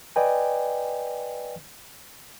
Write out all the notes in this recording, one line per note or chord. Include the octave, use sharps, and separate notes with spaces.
B4 D5 D#5 G5 G#5